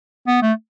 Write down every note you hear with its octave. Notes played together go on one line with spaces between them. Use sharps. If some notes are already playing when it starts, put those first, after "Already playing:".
B3
A3